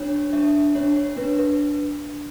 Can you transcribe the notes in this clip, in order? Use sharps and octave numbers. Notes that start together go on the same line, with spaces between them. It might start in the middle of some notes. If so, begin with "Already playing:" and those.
Already playing: D4 C#5
D4 E5
D4 C#5
C#5
D4 B4
B4